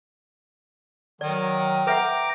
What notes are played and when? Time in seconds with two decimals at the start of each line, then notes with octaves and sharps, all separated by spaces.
1.21 D#3 F#3 D5
1.87 B4 E5 F#5 G5 A#5 D6